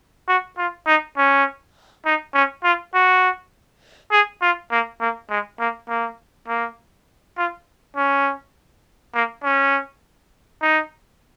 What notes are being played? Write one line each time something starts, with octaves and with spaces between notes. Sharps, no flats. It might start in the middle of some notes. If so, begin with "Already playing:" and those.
F#4
F4
D#4
C#4
D#4
C#4
F4
F#4
G#4
F4
A#3
A#3
G#3
A#3
A#3
A#3
F4
C#4
A#3
C#4
D#4